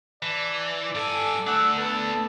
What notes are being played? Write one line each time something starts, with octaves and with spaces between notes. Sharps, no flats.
E3 D5 A5
G2 A4 G#5 D6
A3 D4 F#5 D6 E6
B3 A4 A5